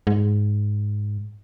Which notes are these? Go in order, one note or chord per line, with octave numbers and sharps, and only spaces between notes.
G#2